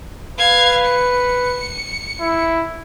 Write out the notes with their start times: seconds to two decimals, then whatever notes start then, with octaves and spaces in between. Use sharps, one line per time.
0.38 B4 F5 G#6
0.85 C#7
2.20 E4